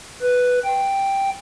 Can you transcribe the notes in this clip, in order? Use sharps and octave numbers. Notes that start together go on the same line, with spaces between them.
B4
G5